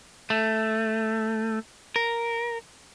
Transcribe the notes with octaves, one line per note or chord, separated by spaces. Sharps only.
A3
A#4